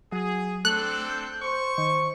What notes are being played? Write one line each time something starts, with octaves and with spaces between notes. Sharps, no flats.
F#3 G#4
A3 C4 D4 A4 F#6
G6
C5 C#6
D#3